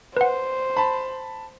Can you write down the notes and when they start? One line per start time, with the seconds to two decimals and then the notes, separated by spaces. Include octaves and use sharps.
0.17 B4 C5 F#5
0.77 A5 B5